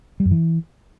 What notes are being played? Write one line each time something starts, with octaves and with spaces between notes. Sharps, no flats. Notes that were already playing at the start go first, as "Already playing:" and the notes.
G3
F#2
E3